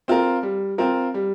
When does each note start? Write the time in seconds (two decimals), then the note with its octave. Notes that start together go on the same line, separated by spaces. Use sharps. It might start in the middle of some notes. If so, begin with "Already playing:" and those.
0.08 C4 F4 A#4
0.43 G3
0.78 C4 F4 A#4
1.14 G3